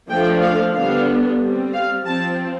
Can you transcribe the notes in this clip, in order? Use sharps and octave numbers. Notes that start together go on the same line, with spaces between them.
F3 A3 D4 G5
F5
D3 G3 B3 D4 F5
G3 C4
F5
F3 C4 A5